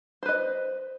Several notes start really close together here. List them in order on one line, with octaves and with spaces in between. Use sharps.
C5 B4 D#5